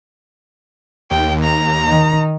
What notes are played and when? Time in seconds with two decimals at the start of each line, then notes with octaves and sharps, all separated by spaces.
1.11 D#2 G5
1.44 A#5
1.87 D#3 D#4